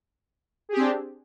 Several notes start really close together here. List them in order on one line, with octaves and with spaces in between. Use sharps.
G#4 G4 C4 D4